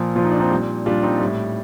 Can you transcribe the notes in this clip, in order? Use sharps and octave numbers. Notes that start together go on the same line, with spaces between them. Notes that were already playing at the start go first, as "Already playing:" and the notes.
Already playing: A#2 F3
A#2 F3 F4
D#4
D4
C4 D#4
A#2 G3
A#2 G3 D4 F4
C4 D#4
A2 G3